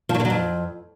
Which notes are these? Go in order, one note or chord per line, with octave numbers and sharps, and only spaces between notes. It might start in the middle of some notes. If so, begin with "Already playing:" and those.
F3
F#3
D3
F#3
F2